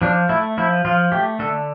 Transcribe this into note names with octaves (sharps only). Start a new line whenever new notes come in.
F3 D4
A3 E4
F3 E4
F3 F4
A3 G4
D3 A4